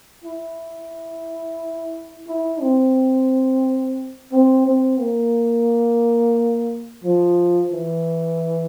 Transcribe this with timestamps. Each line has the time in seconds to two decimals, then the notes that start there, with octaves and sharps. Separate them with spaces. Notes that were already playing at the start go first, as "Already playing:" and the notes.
0.24 E4
2.27 E4
2.61 C4
4.32 C4
4.66 C4
5.00 A#3
7.04 F3
7.72 E3